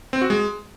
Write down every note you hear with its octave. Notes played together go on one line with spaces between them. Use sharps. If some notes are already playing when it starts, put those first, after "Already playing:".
C4
F#4
G#3